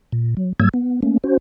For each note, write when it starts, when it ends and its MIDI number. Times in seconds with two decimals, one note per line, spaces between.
0.12 0.34 46
0.37 0.53 54
0.60 0.69 44
0.60 0.69 54
0.60 0.69 55
0.60 0.69 58
0.60 0.69 88
0.60 0.69 92
0.74 1.00 59
1.03 1.18 57
1.03 1.18 58
1.03 1.18 61
1.24 1.37 61
1.24 1.37 66
1.24 1.37 72